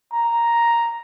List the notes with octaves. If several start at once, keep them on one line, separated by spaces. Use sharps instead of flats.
A#5